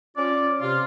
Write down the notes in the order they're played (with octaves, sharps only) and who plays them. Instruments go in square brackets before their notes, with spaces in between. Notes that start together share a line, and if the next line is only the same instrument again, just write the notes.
[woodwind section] C#4 F4 D5
C3 F4